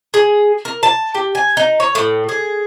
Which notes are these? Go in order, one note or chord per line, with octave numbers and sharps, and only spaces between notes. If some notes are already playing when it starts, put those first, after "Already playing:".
G#4
A#4
A5
G4
G#5
D#4
C#5
A2
G#4